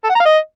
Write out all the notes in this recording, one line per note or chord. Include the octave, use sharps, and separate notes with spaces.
A4
F#5
A#5
F5
D#5